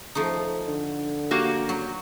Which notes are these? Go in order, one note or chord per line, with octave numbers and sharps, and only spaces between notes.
F3 A3 D#4
D3
A#3 F#4 G4
F#3